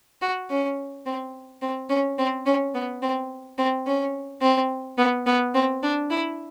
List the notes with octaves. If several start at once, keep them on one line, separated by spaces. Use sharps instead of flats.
F#4
C#4
C4
C4
C#4
C4
C#4
B3
C4
C4
C#4
C4
B3
B3
C4
D4
E4